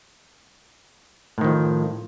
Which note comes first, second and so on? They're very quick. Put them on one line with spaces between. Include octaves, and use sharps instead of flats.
A2 D#3 F3